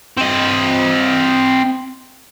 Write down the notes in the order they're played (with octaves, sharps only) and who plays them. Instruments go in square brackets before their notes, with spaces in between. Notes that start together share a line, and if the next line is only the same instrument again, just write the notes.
[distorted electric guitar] C4 D#5